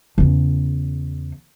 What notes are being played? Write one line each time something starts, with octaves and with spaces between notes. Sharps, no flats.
E2 C#3